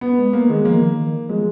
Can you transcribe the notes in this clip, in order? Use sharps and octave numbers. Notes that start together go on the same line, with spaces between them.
B3
G#3
A#3
D#3 G#3
F3 A#3
D#3
F3 G#3